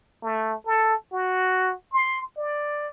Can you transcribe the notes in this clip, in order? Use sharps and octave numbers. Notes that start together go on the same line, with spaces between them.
A3
A4
F#4
C6
D5